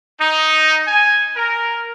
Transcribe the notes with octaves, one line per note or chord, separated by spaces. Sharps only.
D#4
G#5
A#4